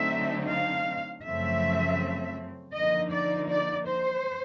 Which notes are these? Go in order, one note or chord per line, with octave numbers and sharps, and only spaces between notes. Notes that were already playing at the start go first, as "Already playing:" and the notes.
Already playing: D3 F#3 A3 C4 D#4 E5
F5
F#2 C#3 F3 A3 C4 E5
D3 F3 A#3 D#4 D#5
D5
D5
C5